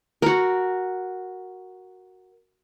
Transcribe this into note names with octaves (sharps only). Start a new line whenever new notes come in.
F#4 A#4